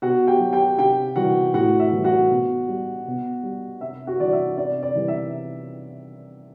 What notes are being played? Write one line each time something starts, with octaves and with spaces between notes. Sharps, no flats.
B2 F#4 F#5
G4 G5
F#3
G4 G5
C3 G4 G5
E3 G3 F#4 F#5
A2 F#4 F#5
E5
E3 G3
F#4 F#5
B2
G3
B2
G3
C3 E5
F#4 F#5
E3 G3 D5
E5
C3 D5
D5
E3 G3
E5